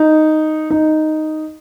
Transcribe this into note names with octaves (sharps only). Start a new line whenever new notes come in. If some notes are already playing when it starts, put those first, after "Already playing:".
Already playing: D#4
D#4